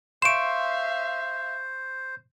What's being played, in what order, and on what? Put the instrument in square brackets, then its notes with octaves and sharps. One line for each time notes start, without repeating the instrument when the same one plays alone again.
[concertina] C5 [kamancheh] E5 F5 [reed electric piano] C6 C#6 [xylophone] D7 E7